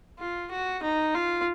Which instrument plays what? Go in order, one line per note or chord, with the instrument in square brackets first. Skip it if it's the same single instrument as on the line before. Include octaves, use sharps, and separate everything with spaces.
[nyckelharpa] F4
F#4
D#4
F4